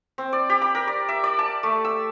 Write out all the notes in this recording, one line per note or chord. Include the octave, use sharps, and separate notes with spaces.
C4
D5
G4
B5
A#4
D5
E5
D5
A5
A3
E6